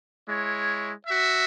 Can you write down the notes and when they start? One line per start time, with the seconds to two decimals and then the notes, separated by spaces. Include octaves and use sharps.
0.28 G#3 E4 C#5
1.07 F#4 E5